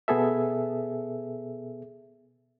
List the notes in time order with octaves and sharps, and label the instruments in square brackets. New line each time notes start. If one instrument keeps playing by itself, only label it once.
[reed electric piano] B2 B3 G#4 A4 E5